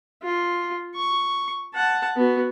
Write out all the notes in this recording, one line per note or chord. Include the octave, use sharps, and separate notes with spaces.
F4
C#6
F#5 A5
B3 F#4